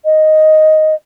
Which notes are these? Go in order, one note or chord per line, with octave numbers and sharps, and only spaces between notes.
D#5